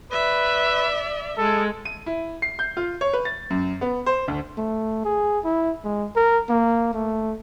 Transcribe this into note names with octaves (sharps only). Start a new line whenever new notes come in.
B4 D5 E5
G#3 A4
D#7
E4
C7
G6
F4
C#5
B4
A6
F#2
B3
C5
D2
A3
G#4
E4
G#3
A#4
A#3
A3